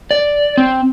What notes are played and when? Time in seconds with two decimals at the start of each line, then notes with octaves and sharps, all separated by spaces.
0.11 D5
0.58 C4